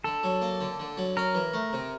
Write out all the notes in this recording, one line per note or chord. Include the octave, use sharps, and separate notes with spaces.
D3 A4
F#3
A#3
D3
D3
F#3
C#4 A#4
E3
A3
C3